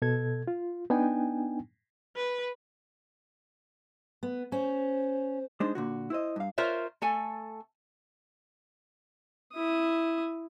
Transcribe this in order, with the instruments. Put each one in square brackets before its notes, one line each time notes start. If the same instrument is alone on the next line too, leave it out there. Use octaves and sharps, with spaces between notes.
[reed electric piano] B2 A4 G#6
F4
B3 D4 D#4 G5 G#5
[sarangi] B4
[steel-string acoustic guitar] B3
[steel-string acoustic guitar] C#4 [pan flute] C5
[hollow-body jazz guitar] G#3 D4 D#4 C5
A#2 D3 F#4
E4 C5 D#5
G2 F5
[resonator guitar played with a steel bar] F4 A#4 C5 C#5 E5
A3 A4 G#5
[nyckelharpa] E4 D#6